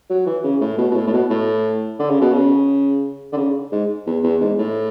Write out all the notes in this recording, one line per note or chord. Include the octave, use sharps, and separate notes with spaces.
F#3
E3
C#3
A2
B2
B2
A2
A2
B2
A2
D3
C#3
B2
C#3
D3
C#3
G#2
E2
E2
G#2
A2